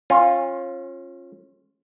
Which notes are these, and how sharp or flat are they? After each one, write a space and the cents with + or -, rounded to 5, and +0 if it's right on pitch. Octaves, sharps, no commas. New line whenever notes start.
C#4 -30 F4 +5